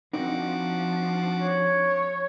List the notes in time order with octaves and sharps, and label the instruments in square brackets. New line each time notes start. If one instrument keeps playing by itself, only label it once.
[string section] F3 D4 [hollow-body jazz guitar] C4 D#4 [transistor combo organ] F#4 D6
[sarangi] C#5